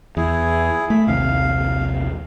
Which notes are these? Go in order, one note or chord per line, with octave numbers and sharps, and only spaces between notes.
E2 E4 G#4
A3 B5
A#1 D#2 C3 F5